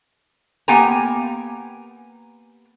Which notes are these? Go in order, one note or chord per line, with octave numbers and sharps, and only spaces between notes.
A#3 B3 G4 G5 G#5 A#5